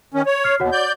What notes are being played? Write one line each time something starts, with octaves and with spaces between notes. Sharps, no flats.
D#3 C#4
C#5
F6 C7
D#2 B2 F#4 C#5 F#5
D5 G6